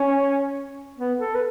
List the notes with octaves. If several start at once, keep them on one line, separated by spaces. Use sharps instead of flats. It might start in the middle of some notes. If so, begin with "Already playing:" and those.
Already playing: C#4
B3
A4
B4